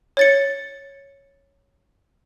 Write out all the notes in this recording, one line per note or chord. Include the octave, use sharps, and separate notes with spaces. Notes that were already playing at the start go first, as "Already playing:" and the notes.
C#5 A6 C#7